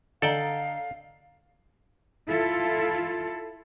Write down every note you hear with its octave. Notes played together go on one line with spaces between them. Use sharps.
D3 A4 D5 D#5 F5 G5 A#5
E4 F4 A4